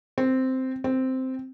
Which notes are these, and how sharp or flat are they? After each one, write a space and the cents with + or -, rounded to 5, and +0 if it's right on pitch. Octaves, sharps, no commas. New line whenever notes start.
C4 -5
C4 -5